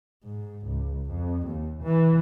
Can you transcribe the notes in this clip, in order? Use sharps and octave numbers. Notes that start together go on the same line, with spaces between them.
G#2
C#2
F2
D#2
E3